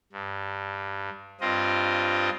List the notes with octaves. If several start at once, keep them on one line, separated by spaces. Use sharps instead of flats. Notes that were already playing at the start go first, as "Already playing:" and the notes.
G2
G2 C4 F4 D#5